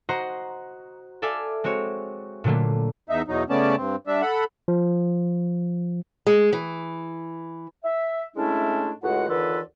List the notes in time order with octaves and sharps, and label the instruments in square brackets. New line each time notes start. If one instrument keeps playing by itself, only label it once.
[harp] F#4 C5 D#5 F#5 A#5 C6
A4 D5 E5 F5 G#5
G#3 C4 F#4 C#5
A#2 D3 F#3 A3 A#3
[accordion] E2 D#4 E5
E2 B2 F#3 D#4
C#3 A3 B3 C#4 D5 A5
G2 C4
G3 D4 E5
A4 F#5 B5
[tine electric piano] F3
[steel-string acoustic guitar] G#3
E3
[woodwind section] E5
A2 G#3 A3 C#4 D4 E4
C#2 A2 G#3 F#4 F#5
D#2 D3 E3 F4 A4 B4